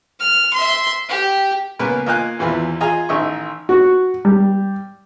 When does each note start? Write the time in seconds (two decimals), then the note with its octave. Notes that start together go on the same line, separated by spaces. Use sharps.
0.20 F6
0.54 E5 C6
1.09 G4
1.79 C#2 A#3 B3 A#4 B4
2.06 A#3 F4 D#5 F5 G#5 F#6
2.39 G#1 E2 E3 F4 B5
2.81 F4 G#4 D#5 G#5 A#5
3.09 A1 D#3 D#5 E5 C#6
3.69 F#4
4.25 G3